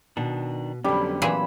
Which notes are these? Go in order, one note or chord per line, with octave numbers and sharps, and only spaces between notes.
B2 D#3 D4
F2 D3 F#3 G3 B3 C#4
A#2 E3 G#4 B5 E6